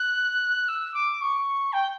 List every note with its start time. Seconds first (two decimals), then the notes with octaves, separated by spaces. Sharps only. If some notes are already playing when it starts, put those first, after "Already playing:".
Already playing: F#6
0.68 E6
0.94 D6
1.21 C#6
1.72 G5